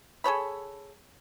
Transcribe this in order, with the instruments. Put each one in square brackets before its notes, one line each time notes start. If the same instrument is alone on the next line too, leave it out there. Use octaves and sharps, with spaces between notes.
[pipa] G#4 A4 C#5 B5